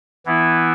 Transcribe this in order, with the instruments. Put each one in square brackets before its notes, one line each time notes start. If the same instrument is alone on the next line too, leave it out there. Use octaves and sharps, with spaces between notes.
[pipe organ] E3 B3 E4